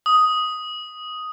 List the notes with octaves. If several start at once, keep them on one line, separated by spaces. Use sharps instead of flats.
D#6